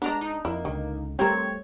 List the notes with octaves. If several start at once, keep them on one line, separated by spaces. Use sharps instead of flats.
G#3 B3 D4 A#5
D4 D#4
F2 A#3 E4
C#2 D3 D#3
G3 A3 C4 G4 A#4 C#5